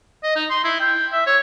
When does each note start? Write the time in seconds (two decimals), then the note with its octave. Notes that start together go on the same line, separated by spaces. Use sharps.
0.24 D#5
0.36 D#4
0.50 C6
0.64 E4
0.80 G5
1.12 E5
1.27 C#5